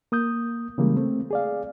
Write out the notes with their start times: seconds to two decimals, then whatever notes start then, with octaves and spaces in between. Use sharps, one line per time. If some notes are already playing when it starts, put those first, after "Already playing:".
0.12 A#3 D#6 G6
0.78 C#3 E3 G3 G#3 A#3
0.96 A3 C4
1.31 G#4 D5 F5